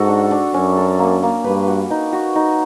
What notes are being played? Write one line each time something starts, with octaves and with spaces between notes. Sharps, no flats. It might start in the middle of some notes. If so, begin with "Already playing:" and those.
Already playing: G#2 F#4 A4
D4
D4
F#2 C#4
A4
A#3
A#3
G2 B4
F#4
D#4
F#4
D#4